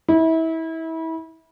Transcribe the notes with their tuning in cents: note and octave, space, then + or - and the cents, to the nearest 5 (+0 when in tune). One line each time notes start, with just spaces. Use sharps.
E4 -30